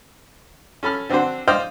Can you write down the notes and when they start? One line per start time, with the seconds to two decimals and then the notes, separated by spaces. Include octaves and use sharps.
0.83 C#4 A4 B5 F6
1.09 D3 C4 D4 F#4 C5
1.48 C5 D5 D#5 F5 G5